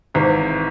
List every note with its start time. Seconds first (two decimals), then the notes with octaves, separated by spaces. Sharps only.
0.14 G#1 G#2 E3